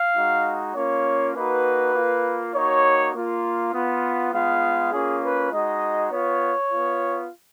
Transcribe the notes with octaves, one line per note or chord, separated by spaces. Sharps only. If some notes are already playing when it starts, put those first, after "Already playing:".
Already playing: F5
G#3 D#4 F#4
A#3 C#4 F4 C#5
A#3 D#4 F#4 B4
A#3 F4
A#3 D#4 F#4 C#5
A#3 F4
B3 F4
G#3 B3 F4 F5
A#3 C#4 F4 G#4
B4
G#3 D#4 F#4 D#5
B3 F4 C#5
B3 F4